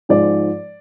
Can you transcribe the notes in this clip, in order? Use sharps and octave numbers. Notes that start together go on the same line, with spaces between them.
G#2 F3 G#3 D5